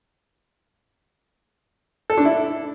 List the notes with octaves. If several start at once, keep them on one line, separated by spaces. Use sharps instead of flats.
A4
D4
E4